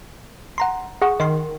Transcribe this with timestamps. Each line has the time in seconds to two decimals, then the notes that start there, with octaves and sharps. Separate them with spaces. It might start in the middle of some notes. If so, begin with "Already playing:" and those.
0.58 F#5 A#5 C6
1.02 G#4 F#5 C#6
1.20 D#3 D#5 C6